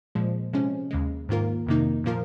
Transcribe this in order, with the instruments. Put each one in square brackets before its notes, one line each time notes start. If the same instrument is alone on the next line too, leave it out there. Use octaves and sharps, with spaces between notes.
[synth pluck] A#2 F3 G#3
C3 F3 G#3 C#4
D#2 C#3 G#3
G#2 D#3 A#3 F4 A#4
F2 C3 D#3 A#3 D#4
A#2 F3 A#3 F4 A#4